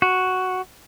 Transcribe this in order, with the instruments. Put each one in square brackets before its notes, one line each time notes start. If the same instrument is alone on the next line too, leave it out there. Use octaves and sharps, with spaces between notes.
[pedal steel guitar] F#4